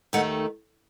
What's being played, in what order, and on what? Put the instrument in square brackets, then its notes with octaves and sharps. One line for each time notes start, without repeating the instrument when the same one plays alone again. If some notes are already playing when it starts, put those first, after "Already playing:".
[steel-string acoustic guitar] D#2 D#3 A3 D#4 F#5